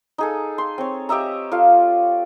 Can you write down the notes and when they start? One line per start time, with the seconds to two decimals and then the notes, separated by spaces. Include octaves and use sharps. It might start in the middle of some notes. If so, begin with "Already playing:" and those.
0.18 D#4 G#4 A4
0.58 C6
0.78 C4 C#5
1.09 G4 D#5 E5 A#5
1.52 F4 A4 F5